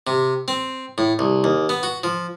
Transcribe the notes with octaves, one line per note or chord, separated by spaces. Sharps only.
C3
C4
A2
C2
D#2
B3
F#4
F3